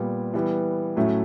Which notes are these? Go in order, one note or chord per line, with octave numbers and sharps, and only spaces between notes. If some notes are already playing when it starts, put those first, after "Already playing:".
Already playing: A#2 G3 B3
E3 G3 B3
A2 F#3 A3 C#4